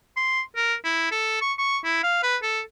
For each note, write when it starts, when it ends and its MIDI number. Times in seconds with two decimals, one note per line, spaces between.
0.17 0.41 84
0.56 0.75 70
0.85 1.09 64
1.12 1.41 69
1.42 1.53 85
1.58 1.79 85
1.84 2.00 64
2.04 2.20 77
2.23 2.37 71
2.42 2.61 69